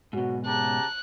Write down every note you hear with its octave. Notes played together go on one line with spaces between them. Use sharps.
G#2 B2 F#3 F#4
C#3 G4 A5 A#5 F#6